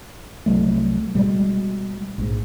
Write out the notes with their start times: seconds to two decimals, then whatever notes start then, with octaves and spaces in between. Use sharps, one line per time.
0.46 C2 F#3 A3
1.15 B2 G3 G#3
2.18 A#1 G#2